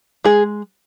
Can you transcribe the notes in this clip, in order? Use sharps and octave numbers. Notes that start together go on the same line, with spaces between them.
G#3 G#4